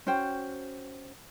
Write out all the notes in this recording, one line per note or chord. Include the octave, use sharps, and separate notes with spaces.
C#4 F#4 C5 G5